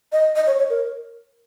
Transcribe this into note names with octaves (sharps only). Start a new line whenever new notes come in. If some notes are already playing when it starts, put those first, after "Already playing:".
D#5
D#5
C#5
C#5
A#4